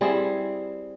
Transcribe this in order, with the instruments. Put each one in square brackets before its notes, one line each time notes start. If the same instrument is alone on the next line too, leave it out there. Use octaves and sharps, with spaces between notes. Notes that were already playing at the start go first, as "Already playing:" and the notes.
[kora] G3 C4 E4 G#4